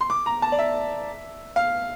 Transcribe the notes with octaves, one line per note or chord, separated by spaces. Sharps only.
C6
D6
A#5
A5
D5
E5
F5